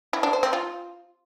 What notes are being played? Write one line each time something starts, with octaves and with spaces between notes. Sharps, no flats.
E4
D4
C5
C4
F4